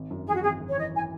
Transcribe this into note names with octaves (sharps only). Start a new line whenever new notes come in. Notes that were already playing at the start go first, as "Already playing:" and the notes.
Already playing: G#1
F#2
E3 G#4
F#4
G#1 G#4
G#1
C#5
E3 D#5
E3 G#5